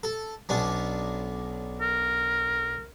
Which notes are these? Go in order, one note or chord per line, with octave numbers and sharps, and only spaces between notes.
A4
B1 C#4 D4
A#4